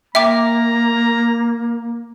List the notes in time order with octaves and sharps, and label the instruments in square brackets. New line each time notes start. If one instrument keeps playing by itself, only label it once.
[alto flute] A#3 [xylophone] E5 G5 D6 [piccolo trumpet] A#5